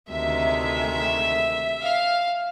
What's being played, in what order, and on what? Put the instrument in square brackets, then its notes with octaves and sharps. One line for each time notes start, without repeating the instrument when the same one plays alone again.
[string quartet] D2 C3 D#3 G#3 [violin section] E5
[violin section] F5